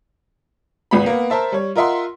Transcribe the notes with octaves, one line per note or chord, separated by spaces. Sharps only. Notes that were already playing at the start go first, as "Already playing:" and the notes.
G#1 C#2 B3 B5
A#3 B3
A#4 C5 E5 A5
G3 C#5
F4 A#4 D#5 E5 F#5 C6